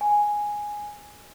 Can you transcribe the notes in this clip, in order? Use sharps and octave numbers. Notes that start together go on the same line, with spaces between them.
G#5